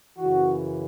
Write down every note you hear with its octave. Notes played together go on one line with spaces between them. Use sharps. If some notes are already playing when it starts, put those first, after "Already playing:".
F#2 C#3 E3 F#4